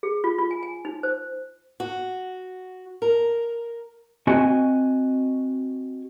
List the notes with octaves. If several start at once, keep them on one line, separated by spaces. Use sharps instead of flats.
G#4
F4
F4
G#5
G#5
D#4
C5
F#4
A#4
C4 F#4 D#5 G#5